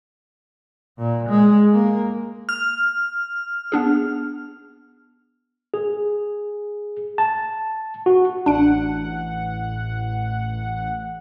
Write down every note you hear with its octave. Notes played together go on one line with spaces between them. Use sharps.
A#2
G#3
A#3
F6
B3 D4 G#4
G#4
A5
F#4
A1 D4 F#5 D7